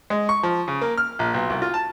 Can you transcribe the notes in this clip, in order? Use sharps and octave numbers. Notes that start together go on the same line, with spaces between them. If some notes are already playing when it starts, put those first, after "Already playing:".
G#3
C#6
F3
C#3
A#3
F6
A#1
B1
C2
F4
A5